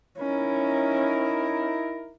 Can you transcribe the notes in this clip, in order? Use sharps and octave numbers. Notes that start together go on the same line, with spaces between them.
C#4 D#4 E4 A#4